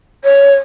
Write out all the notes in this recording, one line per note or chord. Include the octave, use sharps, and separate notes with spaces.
C#5